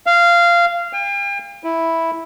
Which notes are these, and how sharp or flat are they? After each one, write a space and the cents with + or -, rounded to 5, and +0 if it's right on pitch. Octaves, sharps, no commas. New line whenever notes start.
F5 -15
G5 +40
E4 -5